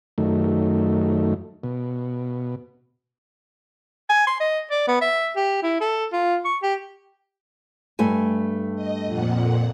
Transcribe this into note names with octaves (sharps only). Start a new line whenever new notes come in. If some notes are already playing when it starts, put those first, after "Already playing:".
F#2 D#3 A3
B2
G#5
C6
D#5
D5
B3
E5
G4
E4
A4
F4
C#6
G4
G2 A3 G#5
D#5
F2 A#2 F#5